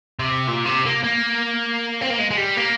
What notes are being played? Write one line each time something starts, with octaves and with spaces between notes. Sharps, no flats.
C3
A#2
C3
A#3
A#3
C4
A#3
G#3
G#3
G3
A#3